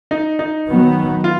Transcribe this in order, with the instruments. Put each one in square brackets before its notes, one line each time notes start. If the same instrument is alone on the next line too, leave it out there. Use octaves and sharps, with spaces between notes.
[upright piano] D#4
D#4
[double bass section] D#3 F#3 B3
[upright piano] F4